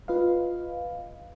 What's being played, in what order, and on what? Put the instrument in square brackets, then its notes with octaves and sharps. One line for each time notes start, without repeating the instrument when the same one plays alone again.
[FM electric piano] F4 B4 D#5 F5